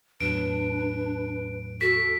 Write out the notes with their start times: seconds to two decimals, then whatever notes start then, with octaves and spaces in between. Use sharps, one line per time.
0.21 E2 A2 F#3 D4 B4 D7
1.81 F#4 A4 B6